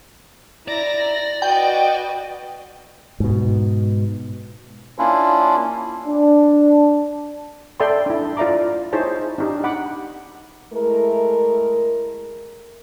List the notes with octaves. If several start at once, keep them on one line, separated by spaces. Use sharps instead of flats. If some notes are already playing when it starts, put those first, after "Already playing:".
E4 D5 A#5 A#6
A#6
F#4 B4 D#5 G5
G#2 B2
A#3 C#4 D4 E4 F4
D4
A4 D5 E5 G5 B5 C6
D4 E4
F4 D5 E5 A#5 D6
D#4 E4 G#4 C5 C#5 A5
D4 D#4 G4
F#5 B5 D6
G#3 A3 E4 A#4